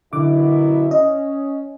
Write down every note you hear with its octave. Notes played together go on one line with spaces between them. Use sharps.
F#2 B2 D3 E4 D6
C#4 D#5